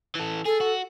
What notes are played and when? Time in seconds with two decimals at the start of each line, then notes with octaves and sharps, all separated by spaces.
0.15 E3 A4
0.46 G#4 A4
0.61 F#4